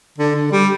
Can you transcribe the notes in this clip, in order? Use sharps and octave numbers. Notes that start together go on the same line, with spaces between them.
D3
D3
G3